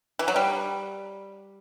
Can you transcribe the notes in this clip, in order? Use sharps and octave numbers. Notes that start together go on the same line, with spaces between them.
E3
F#3
G3